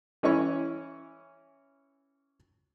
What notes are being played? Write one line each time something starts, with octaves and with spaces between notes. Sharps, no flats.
E3 C#4 E4 C#5 C#6